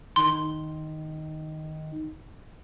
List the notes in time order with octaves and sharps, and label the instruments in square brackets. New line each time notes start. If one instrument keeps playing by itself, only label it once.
[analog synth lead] D#3 [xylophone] C6